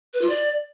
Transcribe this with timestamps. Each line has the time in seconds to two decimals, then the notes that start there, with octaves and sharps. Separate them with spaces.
0.14 B4
0.22 F4
0.29 D5